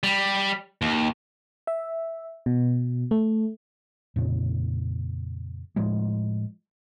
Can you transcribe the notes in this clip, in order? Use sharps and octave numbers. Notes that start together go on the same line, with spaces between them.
G3
D#2
E5
B2
A3
F2 A#2 C#3
A2 F3 G#3